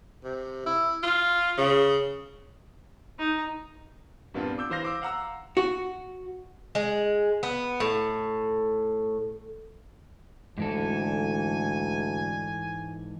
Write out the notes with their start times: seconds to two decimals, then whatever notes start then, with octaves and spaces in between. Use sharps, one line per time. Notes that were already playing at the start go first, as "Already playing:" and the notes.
0.24 C3
0.66 E4
1.03 F4
1.57 C#3
3.19 D#4
4.34 G2 A#2 B3 C4 D4 F4
4.58 D6 E6 G6
4.70 E3 C5 F5 A#6
4.82 C5 D6 E6
5.02 F5 F#5 A#5 E6
5.57 F#4
6.75 G#3
7.43 B3
7.80 A2
10.58 D2 G#2 E3 A4 G#5